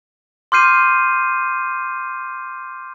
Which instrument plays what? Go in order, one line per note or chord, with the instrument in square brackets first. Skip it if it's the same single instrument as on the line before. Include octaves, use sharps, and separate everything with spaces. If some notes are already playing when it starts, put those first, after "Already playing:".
[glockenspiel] C6 D6 F6 G6 C7 D#7